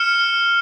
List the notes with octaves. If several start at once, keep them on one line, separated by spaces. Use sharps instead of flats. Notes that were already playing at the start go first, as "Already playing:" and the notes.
Already playing: F6 C#7 E7